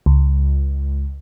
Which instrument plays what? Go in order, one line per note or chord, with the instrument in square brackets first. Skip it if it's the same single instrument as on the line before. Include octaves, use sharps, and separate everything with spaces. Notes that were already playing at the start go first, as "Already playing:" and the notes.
[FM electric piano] C#2